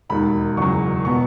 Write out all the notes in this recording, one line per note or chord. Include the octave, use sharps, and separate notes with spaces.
E1 D#2 D#3 B5
F#1 E2 C#3 F#3 C#6
B2 F#3 B3 C#6